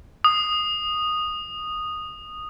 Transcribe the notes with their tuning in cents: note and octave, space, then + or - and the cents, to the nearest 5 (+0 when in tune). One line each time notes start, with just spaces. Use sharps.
D#6 -10